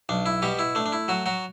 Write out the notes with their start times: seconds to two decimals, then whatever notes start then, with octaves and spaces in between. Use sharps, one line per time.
0.09 B1 D4
0.26 E4
0.42 B2 G3 G4
0.59 E4
0.75 A3 D4
0.86 D4
0.93 E4
1.08 F#3 F#4
1.26 F#3 F#4